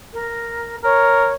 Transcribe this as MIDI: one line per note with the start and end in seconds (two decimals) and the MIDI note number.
0.13 0.76 70
0.84 1.30 70
0.84 1.33 73